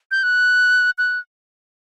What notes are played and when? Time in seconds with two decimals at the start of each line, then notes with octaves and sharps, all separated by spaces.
0.11 G6
0.23 F#6
0.98 F#6